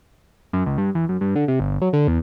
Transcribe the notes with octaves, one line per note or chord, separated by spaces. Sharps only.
F#2
C#2
G2
E2
F#2
G2
D3
C3
G1
F#3
D3
E2